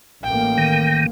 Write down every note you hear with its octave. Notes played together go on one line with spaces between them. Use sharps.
A1 A#3 G5
D#3